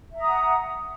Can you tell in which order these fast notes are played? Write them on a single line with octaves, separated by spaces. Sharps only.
E5 A#5 D#6 F#5